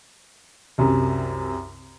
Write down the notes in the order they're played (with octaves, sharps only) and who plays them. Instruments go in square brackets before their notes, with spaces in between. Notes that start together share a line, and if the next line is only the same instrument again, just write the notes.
[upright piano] C2 F#2 C3